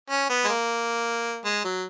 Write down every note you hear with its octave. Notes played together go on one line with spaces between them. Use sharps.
C#4
B3
G#3
A#3
G#3
F#3